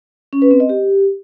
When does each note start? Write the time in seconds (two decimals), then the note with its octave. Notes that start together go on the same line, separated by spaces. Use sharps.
0.33 C#4
0.42 B4
0.51 C4
0.60 D#5
0.69 G4